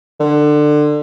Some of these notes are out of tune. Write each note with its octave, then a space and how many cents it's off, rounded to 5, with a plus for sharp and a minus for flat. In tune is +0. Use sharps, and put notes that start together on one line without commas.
D3 +25